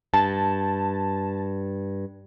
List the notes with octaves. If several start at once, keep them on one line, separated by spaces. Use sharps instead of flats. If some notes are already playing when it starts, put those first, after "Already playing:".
G2 A5